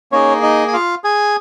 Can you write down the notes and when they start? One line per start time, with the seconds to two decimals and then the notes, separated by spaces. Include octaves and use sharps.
0.12 A#3 C#4 D#4 G#4 C#5
0.43 D#4 D#5
0.68 G#5
0.73 F4 F5
1.04 G#4 G#5